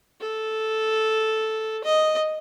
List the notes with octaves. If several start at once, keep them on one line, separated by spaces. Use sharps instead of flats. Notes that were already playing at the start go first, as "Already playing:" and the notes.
A4
D#5